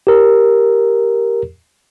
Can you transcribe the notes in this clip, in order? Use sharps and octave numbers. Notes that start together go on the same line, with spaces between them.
G4 A#4